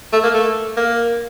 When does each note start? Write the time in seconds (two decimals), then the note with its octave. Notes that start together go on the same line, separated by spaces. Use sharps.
0.13 A3
0.24 A#3
0.34 A3
0.77 A#3